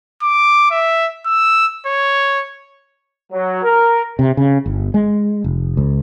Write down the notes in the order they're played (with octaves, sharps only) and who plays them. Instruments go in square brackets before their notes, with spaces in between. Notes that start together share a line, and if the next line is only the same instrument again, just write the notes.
[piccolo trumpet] D6
E5
E6
C#5
[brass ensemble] F#3
A#4
[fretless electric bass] C3
C#3
G1
G#3
F1
C#2